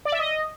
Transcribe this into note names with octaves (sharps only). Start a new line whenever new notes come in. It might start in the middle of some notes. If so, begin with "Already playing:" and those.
D5
E5
D#5